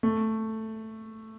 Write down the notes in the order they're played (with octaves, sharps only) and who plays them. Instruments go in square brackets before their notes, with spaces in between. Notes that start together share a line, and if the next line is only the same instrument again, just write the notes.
[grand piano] A3